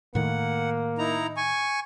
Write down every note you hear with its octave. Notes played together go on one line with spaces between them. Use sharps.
A2 D#3 A#3 F#5
D#4 E4 A#5
G#5 C#6